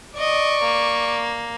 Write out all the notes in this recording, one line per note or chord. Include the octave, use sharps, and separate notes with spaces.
D5 D#5 C#6
A#3